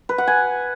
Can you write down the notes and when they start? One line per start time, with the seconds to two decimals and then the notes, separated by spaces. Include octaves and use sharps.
0.09 B4
0.18 F#5
0.27 G#5